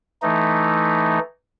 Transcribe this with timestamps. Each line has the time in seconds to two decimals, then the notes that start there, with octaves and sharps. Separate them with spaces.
0.22 E3 A3 D#4